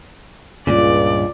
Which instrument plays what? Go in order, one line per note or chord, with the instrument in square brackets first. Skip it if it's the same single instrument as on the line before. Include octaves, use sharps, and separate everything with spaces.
[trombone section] C#2 [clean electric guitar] G2 A#2 C#3 [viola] D5